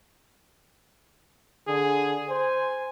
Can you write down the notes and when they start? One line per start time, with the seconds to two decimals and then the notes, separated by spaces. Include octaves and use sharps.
1.68 D3 G#4
2.29 C5 G#5